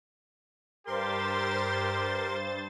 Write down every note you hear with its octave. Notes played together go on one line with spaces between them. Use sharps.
G2 G4 A#4 C5 C6 A6